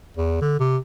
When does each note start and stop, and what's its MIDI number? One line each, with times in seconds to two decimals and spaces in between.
0.17 0.40 40
0.41 0.59 50
0.59 0.77 48